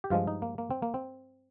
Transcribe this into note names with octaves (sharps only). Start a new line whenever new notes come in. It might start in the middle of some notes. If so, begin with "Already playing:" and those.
G4
G2 F3 G#3 F4
D#4
A#3
A#3
C4
A#3
C4